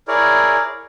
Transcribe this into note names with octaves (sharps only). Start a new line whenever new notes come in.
E4 G#4 A#4 C#5 D5